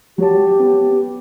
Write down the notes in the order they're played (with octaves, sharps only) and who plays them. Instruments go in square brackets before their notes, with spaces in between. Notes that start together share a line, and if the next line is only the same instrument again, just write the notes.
[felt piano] F#3 C#5 A5 [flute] G4
[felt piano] B3